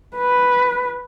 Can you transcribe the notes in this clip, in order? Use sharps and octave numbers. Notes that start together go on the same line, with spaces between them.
B4